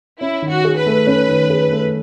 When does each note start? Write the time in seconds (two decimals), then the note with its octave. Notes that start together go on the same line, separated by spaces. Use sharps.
0.21 C#4 E4
0.42 D#3
0.50 F#4
0.65 G#4
0.78 B4
0.86 A3
1.07 C#4
1.28 D#3
1.50 G#4
1.72 A3